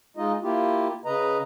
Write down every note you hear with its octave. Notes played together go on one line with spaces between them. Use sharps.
G#3 D#4 F4 D#5
A#3 E4 F4 G4
C#3 B4 D#5 A#5